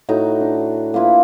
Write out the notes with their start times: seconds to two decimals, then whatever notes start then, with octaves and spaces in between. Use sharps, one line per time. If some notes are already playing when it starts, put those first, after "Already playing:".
0.09 A2 D#4 F#4 A#5
0.40 D4
0.94 A#3 E4 F4 B4